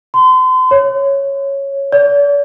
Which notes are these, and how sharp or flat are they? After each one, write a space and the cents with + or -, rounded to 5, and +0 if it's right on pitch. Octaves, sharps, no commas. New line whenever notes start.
C6 -40
C#5 -5
D5 -45